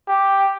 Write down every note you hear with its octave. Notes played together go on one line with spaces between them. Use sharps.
G4